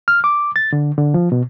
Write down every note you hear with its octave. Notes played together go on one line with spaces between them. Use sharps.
F6
D6
A6
D3
D3
F3
B2